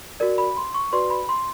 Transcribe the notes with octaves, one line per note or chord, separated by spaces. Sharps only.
F#4 A#4 D5
B5
C6
C#6
F#4 B4 D5 C6
B5
C6